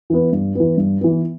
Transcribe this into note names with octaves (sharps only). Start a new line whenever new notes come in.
E3 B3
G2
E3 B3
G2
E3 B3